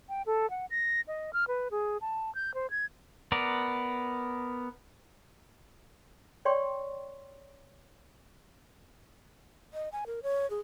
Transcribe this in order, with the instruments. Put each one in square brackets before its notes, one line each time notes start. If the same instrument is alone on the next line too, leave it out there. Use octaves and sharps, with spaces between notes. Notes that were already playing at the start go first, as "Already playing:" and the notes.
[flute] G5
A4
F#5
A#6
D#5
F6
B4
G#4
A5
G6
C5
G#6
[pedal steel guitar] B3 A#4 D5
[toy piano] C#5 D5 G5 C6 C#6
[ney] D#5
G#5
A#4
C#5
G#4